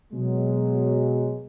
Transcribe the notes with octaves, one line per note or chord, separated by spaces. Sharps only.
B2 F#3 G#3